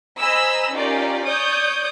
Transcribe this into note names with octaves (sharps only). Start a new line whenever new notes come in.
C5 D#5 G#5 A#5 B5 E6
C#4 D#4 F4 G4 A#4 D5
C#5 D5 D#6 G6